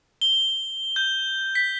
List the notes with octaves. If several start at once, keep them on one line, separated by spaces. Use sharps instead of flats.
G7
G6
B6